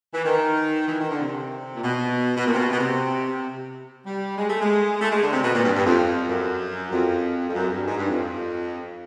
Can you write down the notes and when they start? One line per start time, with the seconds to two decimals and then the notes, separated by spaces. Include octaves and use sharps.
0.14 E3
0.25 D#3
0.89 E3
1.00 D#3
1.10 D3
1.21 C3
1.74 A#2
1.84 B2
2.37 B2
2.47 A#2
2.54 C3
2.58 B2
2.73 B2
2.79 C3
4.06 G3
4.38 G#3
4.50 A3
4.62 G#3
5.02 A3
5.12 G#3
5.23 D3
5.33 C3
5.44 B2
5.55 A#2
5.65 G2
5.76 G2
5.86 F2
6.29 F#2
6.92 F2
7.50 F2
7.55 F#2
7.71 G2
7.87 G#2
7.98 G2
8.09 F2